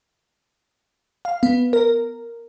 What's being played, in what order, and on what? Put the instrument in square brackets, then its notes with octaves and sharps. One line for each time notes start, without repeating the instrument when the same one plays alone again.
[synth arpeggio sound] F5
B3
A#4